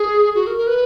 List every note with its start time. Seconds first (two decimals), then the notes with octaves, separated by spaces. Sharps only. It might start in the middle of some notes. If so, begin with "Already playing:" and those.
Already playing: G#4
0.35 F#4
0.47 A#4
0.57 A#4
0.67 B4